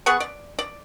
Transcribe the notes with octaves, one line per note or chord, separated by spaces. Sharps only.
B3 G#4 F#5 C#6
D5
D5